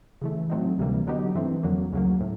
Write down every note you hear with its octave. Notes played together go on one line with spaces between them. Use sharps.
C#3 E3 A3
A2 F#3 A3 C4 D#4
D2 C3 E3 G3 A#3
D3 F#3 B3 D#4 G4
G2 E3 A3 C4
F2 D3 F#3 A#3
D2 C#3 F#3 A#3
A2